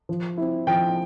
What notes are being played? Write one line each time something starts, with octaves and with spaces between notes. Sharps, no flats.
F3
C4 E4
F3 G5